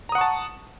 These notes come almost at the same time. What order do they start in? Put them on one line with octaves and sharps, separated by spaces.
A#5 D#6 F#5 C#6 A5